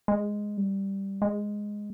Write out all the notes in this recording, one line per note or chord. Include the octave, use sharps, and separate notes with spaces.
G#3
G3
G#3